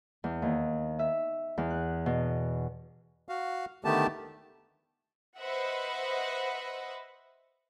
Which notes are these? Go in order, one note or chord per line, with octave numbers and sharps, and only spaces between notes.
E2
D#2
E5
E2
F#6
B2
F#4 F5
D3 D#3 A3 B3 G4 A5
B4 C5 D#5 E5 F#5